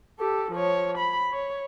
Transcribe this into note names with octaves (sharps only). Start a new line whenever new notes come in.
G4 A4
F3 C#5
B5
C#5